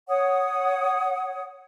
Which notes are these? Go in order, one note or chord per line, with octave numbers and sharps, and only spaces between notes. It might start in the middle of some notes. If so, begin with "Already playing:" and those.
C#5 F#5 D#6